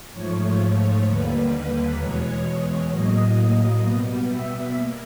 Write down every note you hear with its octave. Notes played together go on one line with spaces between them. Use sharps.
G#2 F3 A3 C#5
D#2 D3 G3 A#3 B4
E2 B2 G#3 C#5
A2 F#3 A#3 D#5
B2 G3 B3
E5
A#3